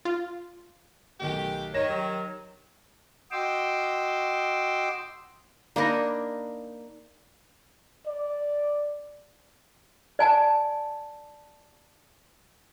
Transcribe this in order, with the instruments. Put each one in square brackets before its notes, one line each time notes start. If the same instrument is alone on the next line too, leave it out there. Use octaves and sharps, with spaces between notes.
[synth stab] F4
[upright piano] B1 D#3 A3 [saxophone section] G4
[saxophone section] D#3 [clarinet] C#5 [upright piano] A#6 E7
[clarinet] F#3 [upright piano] G4
[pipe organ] F#4 D#5 G5 C6 D6 E6
[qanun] A#3 D4 D#4 [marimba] D5 B5 A#6
[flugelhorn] D5
[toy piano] D5 G#5 A5